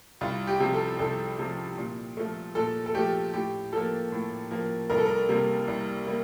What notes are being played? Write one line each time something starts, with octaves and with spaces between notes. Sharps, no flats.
C2 F4
G4
C3 F3
A4
C2 A4
C3 F3
A#2
F3 A3
A#2 A4
A4
F3 A3 G4
A2 G4
F3 A#3 A4
A2
F3 A#3
C2 A#4
A4
A#4
C3 G3 A#3
C2
G3 A#3